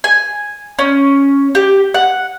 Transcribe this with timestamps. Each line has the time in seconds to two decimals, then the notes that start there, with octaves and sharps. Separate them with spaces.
0.04 G#5
0.79 C#4
1.55 G4
1.94 F#5